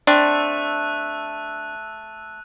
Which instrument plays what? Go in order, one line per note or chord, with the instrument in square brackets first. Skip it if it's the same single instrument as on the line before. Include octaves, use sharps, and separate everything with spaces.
[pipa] A3 C4 [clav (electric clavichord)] D4 [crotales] E6 F#6 D#7